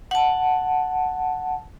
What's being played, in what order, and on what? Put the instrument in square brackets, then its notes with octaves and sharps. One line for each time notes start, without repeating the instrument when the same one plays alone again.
[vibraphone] F#5 A5